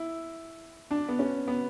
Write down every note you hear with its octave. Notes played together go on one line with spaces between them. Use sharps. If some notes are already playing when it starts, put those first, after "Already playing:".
Already playing: E4
D4
B3
C#4
B3